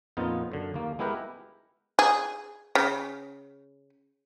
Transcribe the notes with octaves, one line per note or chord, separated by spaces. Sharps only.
F2 A#2 B3 D#4 F4
F#2 D3
D#2 A#3
G#3 B3 E4 G4 A#4 B4
G#4
C#3